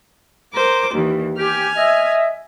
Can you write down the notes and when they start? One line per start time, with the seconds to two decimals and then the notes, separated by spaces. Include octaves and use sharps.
0.53 A#4 C5 D6
0.94 D#2 E3
1.37 G4 G#5 F6
1.76 D#5 E5